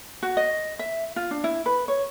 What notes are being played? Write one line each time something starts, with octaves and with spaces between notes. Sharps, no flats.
F#4
D#5
E5
F4
D4
E4
B4
C#5